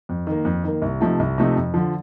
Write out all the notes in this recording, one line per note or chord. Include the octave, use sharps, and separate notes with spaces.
F2
D#3 A#3
F2
D#3 A#3
C2
C3 F3 A3 D#4
C2
C3 F3 A3 D#4
F2
D3 F3